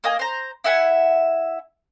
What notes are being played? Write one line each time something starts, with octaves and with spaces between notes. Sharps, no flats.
A#3 D#5 G#5
C5 A#5
E4 E5 F#5 G#5